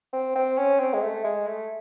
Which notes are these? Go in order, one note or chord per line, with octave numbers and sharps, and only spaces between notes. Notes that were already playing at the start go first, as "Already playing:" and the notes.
C4
C4
C#4
C4
G#3
A3
G#3
A3